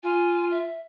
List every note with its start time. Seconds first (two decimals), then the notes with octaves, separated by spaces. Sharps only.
0.03 F4 G#5
0.51 E5